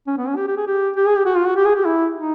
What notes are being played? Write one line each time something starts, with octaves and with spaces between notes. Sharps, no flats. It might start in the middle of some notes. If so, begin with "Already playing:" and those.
C#4
B3
C#4
G4
G4
G#4
G4
G4
G#4
G4
F#4
F4
F#4
G4
G#4
G4
E4
D#4